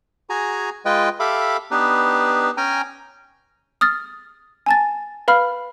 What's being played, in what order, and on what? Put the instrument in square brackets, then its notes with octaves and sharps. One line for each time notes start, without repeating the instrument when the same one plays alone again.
[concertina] F#4 G#4 G#5 A#5
G#3 F4 B4 D#5 G5
G4 A4 E5 F5 B5 D6
B3 D4 D#4 G4 B4
C#4 G5 G#5 A#5
[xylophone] D#6 F6 A6
G#5 A5 A6
B4 F5 B5 F6